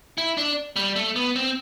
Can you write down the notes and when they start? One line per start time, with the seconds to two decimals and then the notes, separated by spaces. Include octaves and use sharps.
0.18 E4
0.37 D4
0.76 G3
0.96 A3
1.16 B3
1.36 C4